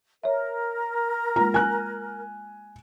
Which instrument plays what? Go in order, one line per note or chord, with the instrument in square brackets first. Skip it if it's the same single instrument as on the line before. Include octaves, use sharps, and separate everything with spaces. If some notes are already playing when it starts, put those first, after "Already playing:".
[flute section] A#4 [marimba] C#5 E5
[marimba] G#3 A#3 F4 [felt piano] A#5
[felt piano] G#5 F#6